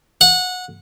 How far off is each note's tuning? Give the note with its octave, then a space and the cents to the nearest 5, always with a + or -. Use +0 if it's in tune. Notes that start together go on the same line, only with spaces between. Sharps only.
F#5 -20